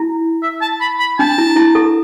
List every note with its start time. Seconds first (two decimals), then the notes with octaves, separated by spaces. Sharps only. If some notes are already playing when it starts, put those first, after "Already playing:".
Already playing: E4
0.42 E5
0.61 A5
0.81 B5
0.99 B5
1.19 D4 A5
1.38 E4
1.56 E4
1.75 A4